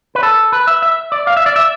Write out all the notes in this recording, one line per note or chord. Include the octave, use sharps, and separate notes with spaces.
B4
A4
B4
E5
E5
D5
F5
E5
D5
E5